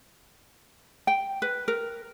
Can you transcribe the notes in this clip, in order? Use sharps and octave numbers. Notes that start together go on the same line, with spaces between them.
G5
B4
A#4